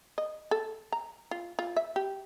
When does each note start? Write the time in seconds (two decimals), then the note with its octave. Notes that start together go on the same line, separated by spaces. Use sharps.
0.18 D#5
0.51 A4
0.92 A#5
1.31 F4
1.59 F4
1.76 E5
1.96 G4